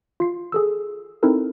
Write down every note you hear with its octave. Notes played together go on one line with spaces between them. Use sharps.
F4 C7
G#4 A4 E6
C4 D#4 E4 A4 A#4